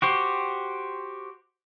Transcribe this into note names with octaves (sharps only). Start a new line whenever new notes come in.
F#4 G4 C5